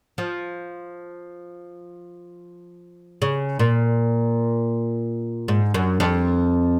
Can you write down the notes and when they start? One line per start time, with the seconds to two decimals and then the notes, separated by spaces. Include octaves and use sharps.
0.18 F3
3.22 C#3
3.59 A#2
5.48 G#2
5.74 F#2
6.00 F2